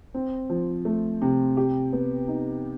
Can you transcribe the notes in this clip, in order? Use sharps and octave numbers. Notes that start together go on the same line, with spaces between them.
C4
F3
A3
C3
G4
B3
D#4